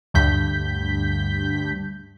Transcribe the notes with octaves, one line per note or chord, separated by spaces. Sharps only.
D2 G2 G6 B6